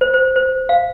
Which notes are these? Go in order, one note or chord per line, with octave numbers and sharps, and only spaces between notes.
C5
C5
C5
F5